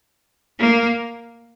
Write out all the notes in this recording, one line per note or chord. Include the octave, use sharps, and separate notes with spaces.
A#3